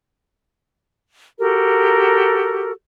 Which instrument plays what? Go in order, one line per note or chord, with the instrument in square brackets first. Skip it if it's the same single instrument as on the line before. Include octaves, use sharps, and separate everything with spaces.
[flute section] F#4 G4 A4 A#4